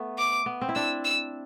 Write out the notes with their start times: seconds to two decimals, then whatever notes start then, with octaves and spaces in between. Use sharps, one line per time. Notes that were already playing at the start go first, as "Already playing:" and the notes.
Already playing: A3 B3
0.18 D6
0.46 B3
0.61 C4
0.69 E4
0.75 D4 E6
1.05 E6